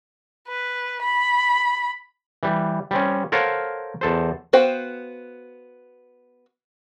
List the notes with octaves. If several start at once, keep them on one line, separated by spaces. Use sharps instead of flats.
B4
B5
E3 G3
G3 C4 C#4
A4 A#4 C5 C#5 F5 F#5
E2 A4 C5
B3 F#4 C5 F5 G5